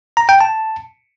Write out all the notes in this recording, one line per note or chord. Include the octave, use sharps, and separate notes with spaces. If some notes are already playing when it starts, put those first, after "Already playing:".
A#5
G5
A5